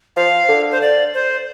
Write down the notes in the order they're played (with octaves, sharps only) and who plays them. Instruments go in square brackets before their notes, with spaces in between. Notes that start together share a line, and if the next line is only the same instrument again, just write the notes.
[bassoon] F3 [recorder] F5
[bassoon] D3
[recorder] C5
D5
C5